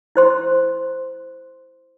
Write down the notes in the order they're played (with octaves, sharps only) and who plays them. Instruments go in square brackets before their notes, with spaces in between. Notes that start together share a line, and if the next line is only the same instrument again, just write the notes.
[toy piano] E4 C5 C6